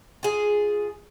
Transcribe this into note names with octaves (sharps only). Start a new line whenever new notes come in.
F4 G#4